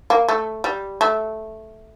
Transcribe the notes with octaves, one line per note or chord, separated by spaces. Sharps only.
A#3
A3
G3
A3